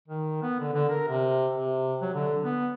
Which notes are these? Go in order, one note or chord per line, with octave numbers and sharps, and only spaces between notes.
D#3
B3
D3
D3
A#4
C3
C3
F#3
D3
B3